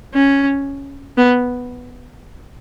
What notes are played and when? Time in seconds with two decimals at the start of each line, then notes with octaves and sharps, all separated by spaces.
0.14 C#4
1.17 B3